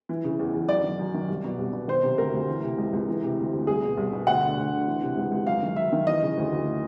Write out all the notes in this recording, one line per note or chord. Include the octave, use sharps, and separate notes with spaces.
E3
C#3
E2
E2
F#2 D5
D#3
F#2
D#3
C2
B2
C2
B2
D#3 C5
C3
D2 A#4
D2
E3
C3
C#2
C#2
E3
C3
D2
D2
C2 G#4
B2
C2
B2
D2 F#5
D3
D2
D3
E3
C3
C#2
C#2
F#2 F5
D#3
F#2 E5
D#3
E3 D#5
C#3
D2
D2